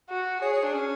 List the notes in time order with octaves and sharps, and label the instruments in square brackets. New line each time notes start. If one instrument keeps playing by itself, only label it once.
[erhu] F#4
[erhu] G#4 [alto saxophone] C#5
[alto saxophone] C#5
D4
C#4